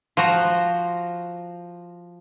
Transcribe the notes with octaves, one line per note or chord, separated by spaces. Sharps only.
F3 F#4 A#5